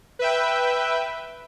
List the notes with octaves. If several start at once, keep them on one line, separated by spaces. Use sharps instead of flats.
B4 E5 G5